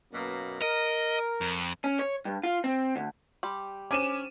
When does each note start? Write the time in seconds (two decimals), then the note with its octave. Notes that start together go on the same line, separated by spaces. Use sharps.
0.12 F#2 B2 A#3
0.62 A#4 D#5
1.41 F2
1.84 C#4
1.99 C#5
2.25 G2
2.43 F4
2.64 C4
2.96 D2
3.43 G3 G4 C6
3.91 C#4 D4 C5 G#5 D6 D#7 E7